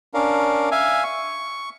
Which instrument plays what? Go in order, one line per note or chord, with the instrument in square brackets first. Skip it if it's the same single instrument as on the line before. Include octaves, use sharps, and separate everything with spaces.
[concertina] C#4 D4 A#4 F5
E5 F5 G#5
C#6